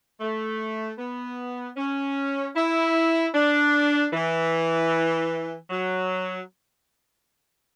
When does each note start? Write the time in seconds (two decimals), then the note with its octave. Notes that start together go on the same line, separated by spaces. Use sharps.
0.21 A3
0.99 B3
1.77 C#4
2.56 E4
3.35 D4
4.13 E3
5.70 F#3